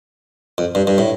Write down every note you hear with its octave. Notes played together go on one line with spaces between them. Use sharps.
F2
G2
G2
A2